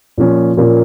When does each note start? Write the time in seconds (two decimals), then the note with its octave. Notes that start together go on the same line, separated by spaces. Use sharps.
0.18 A#2 F3 A#3 C#4
0.57 A#2 F3 A#3 C#4